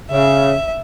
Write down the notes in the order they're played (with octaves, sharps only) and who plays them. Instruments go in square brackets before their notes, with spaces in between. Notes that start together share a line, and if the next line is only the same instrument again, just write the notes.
[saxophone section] C#3 [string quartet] E5